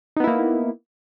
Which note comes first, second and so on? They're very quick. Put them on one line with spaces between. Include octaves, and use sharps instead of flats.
D#4 B3 E4 A#3